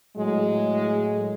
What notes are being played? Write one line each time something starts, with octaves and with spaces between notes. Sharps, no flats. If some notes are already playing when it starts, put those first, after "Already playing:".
A2 F#3 G#3